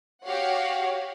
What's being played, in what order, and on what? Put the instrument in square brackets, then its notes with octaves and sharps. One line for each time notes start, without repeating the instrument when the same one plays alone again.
[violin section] F#4 G4 C#5 F5 F#5